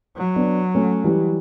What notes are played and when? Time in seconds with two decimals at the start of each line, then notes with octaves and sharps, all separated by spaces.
0.17 F#3
0.36 B3 D4
0.75 A3 C#4
1.04 E3 G3